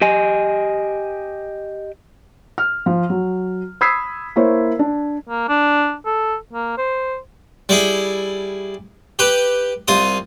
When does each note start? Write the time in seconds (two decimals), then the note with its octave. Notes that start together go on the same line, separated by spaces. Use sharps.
0.01 G4 D#5 G#5
2.58 F6
2.86 F3
3.10 F#3
3.81 B5 D#6 E6 G#6 B6 C7
4.36 A#3 E4 C5 C#5
4.79 D4
5.29 A#3
5.48 D4
6.06 A4
6.53 A#3
6.78 C5
7.69 G3 E4 G#4
9.19 G4 B4
9.88 C2 F4 D#6